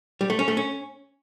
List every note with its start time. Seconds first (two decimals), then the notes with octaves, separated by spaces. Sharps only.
0.21 G3
0.30 A3
0.39 C#4
0.48 A3
0.57 C#4